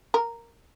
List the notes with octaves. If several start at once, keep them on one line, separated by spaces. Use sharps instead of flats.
A#4